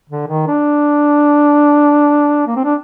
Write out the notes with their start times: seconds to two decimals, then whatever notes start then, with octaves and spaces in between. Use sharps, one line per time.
0.09 D3
0.28 D#3
0.47 D4
2.47 A#3
2.56 C4
2.65 D4